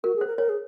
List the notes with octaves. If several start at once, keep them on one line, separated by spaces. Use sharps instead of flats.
F#4 A#4
G#4
C5
A#4
A#4 C#5
G#4